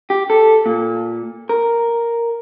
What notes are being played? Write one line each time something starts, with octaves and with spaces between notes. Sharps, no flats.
G4
A4
A#2
A#4